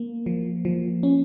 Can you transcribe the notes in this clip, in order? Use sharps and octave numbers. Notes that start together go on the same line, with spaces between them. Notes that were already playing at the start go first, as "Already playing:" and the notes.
Already playing: A#3
F3
F3
C#4